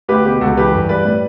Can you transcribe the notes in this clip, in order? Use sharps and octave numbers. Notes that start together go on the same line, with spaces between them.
D2 G4 B4
B2 G4
C#2 F#4 A4
E3 G4 B4
G2
G3 B4 D5
A2